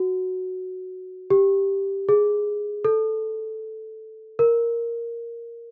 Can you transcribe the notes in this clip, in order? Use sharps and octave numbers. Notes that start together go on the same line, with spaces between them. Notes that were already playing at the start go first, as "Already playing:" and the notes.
Already playing: F#4
G4
G#4
A4
A#4